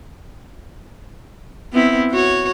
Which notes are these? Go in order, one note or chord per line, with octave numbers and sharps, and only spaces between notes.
B3 C4 E4
F#4 C#5